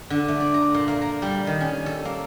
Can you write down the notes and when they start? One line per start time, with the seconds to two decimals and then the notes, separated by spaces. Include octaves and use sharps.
0.10 D3
0.28 A3
0.40 D5
0.54 A#5
0.74 A#2
0.88 A#3
1.02 A#5
1.22 G3
1.47 D#3
1.61 C#4
1.86 A4
2.05 A#3